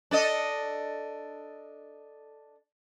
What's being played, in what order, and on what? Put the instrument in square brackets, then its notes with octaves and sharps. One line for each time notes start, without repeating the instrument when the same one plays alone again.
[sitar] D4 A4 D#5